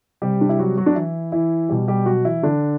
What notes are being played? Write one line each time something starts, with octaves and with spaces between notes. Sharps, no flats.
C3 G3 G4
D4
E4
F#3 F#4
F#3 F#4
D4
E3 E4
E3 E4
B2 G3 G4
G3 G4
F#3 F#4
E3 E4
D3 D4